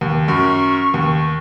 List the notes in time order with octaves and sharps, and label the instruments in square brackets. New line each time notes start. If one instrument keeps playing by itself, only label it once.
[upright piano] D#2
[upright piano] F#2 [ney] C#6
[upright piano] D#2